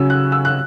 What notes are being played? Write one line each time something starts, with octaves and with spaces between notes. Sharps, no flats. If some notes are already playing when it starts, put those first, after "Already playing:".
Already playing: C#3 F#3 C#4 E6
F#6
E6
F#6